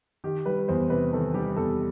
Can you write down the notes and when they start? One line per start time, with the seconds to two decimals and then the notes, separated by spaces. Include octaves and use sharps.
0.24 D#3 G4
0.46 G3 B4
0.68 E2 C5
0.90 C3 B4
1.12 D#3 A4
1.34 G3 G4
1.56 E2 A4